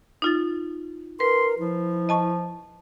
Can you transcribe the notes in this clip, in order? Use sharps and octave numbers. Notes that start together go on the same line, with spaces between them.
D#4 F4 A6
A#4 B4 C6
F3 E4
D#5 A5 C#6